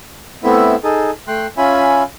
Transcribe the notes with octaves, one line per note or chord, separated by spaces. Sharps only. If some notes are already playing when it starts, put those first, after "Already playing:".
A3 B3 C4 E4 E5
D#4 G#4 A4
A3 G5 C6 F#6
C#4 F4 E5 G#5 B5